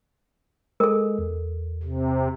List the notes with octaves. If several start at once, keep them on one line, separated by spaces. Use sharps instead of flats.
G#3 A4 A#4
E2
C3